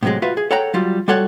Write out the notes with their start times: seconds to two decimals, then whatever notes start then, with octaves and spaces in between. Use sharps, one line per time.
0.03 A2 C3 D#3 F#3 G#3
0.22 F4 F#4 B4 E5 F5
0.37 G#4
0.51 A4 C#5 F#5 G5 A#5
0.74 F#3 G3 F4
1.08 G3 F4 F#4 A4 C#5 F#5